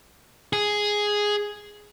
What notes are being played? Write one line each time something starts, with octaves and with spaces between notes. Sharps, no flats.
G#4